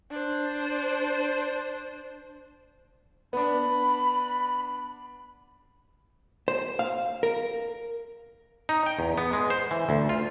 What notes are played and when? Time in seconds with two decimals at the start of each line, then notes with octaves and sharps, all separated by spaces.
0.11 D4 C5
3.33 B3 D4 B5
6.48 C5
6.79 F5
7.23 A#4
8.69 D#4
8.86 G5
8.99 E2
9.18 B3
9.33 G#3
9.50 C5
9.71 E3
9.89 D2
10.09 F4